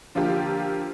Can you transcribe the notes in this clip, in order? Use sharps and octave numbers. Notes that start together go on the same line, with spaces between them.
D3 F3 A#3 F4 G4